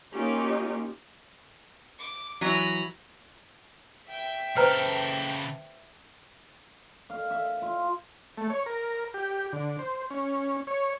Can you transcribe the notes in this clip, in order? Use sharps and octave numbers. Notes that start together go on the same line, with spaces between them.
A#3 C#4 D#4 F4 G4
D6
E3 F#3 A#5 B5
E5 G5
C#3 A4 B4 C5 A#5
F5
E5
F4
A3
C#5
A#4
G4
D3
C5
C#4
C#5